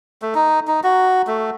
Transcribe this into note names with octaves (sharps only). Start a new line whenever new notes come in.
A3
D#4
D#4
F#4
A3